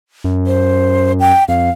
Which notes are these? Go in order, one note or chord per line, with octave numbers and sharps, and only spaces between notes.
F#2
C5
G5
F2 F5